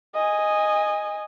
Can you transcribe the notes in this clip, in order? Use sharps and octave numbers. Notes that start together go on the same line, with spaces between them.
D#5 G#5